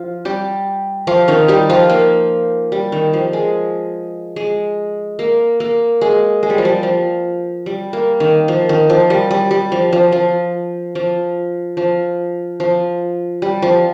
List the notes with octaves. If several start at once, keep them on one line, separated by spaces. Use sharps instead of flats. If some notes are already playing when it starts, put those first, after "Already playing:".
Already playing: F3 F4
G3 G4
F3 F4
D#3 D#4
G3 G4
F3 F4
A#3
G3
D#3
F3
G#3
G#3
A#3
A#3
G#3
G#3
G3
F3
G3
F3
G3
A#3
D#3
F3
D#3
F3
G3
G3
G3
F3
F3
F3
F3
F3
F3
G3
F3